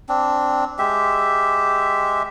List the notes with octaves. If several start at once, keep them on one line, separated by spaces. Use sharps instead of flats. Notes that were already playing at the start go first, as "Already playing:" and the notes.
C4 D4
G#3 G4 E5